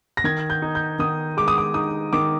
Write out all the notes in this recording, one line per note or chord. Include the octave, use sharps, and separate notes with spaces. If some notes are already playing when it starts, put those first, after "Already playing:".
A#6
D#3 G#6
G6
D#4
G6
D#3 D#6
G#3 D6
D#6
D6
D#4 D#6
D#3 D6